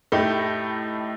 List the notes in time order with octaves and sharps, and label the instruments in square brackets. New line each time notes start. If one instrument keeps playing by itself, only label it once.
[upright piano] A2 A3 D#4 G4